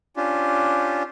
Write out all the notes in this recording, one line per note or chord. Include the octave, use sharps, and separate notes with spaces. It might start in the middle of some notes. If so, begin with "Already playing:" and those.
C#4 D4 F4 G4